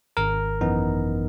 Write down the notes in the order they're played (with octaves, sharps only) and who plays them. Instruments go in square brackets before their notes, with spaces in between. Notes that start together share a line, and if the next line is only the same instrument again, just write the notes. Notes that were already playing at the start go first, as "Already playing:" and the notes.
[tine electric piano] G#1 A#4
F#2 E3 B3 D#4